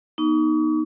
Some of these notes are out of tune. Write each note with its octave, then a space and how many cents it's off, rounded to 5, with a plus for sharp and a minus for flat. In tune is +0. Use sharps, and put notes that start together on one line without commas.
B3 -35 D#4 +0 C#6 +40